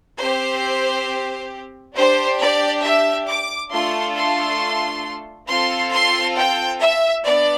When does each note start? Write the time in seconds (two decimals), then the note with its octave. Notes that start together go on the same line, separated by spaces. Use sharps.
0.19 C4 G4 C5
1.96 D4 G4 C5
2.40 D5
2.83 E5
3.28 D6
3.72 A3 D4 F4 A4 C6
4.16 C6
5.48 C4 F4 A4 C6
5.93 C6
6.36 G5
6.80 E5
7.25 B3 D4 D5